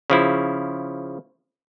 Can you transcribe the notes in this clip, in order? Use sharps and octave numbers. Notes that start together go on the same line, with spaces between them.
C#3 F3 E4